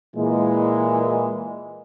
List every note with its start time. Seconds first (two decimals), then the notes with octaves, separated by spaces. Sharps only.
0.16 A#2 E3 G#3